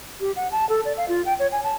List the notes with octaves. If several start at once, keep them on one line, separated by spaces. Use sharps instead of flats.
G4
F#5
A5
A4
D5
F5
F4
G5
C#5
G#5
A5